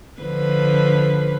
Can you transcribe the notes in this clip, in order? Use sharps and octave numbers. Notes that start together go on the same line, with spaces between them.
D3 F3 B4